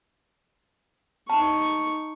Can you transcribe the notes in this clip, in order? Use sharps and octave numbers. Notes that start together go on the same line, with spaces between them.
D#4 A5 C#6